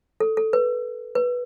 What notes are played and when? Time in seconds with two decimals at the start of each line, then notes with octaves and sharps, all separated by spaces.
0.20 A4
0.37 A4
0.53 B4
1.15 B4